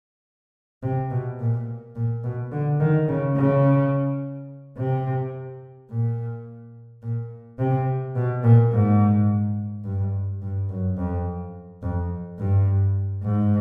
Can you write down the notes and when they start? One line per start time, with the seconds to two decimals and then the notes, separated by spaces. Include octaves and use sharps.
0.83 C3
1.11 B2
1.40 A#2
1.96 A#2
2.24 B2
2.52 D3
2.80 D#3
3.08 C#3
3.37 C#3
4.78 C3
5.90 A#2
7.02 A#2
7.59 C3
8.16 B2
8.44 A#2
8.73 G#2
9.85 G2
10.42 G2
10.69 F#2
10.97 F2
11.83 F2
12.39 G2
13.23 G#2